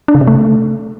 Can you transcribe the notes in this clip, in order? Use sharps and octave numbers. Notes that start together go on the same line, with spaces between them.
D4
C#3
C3
A3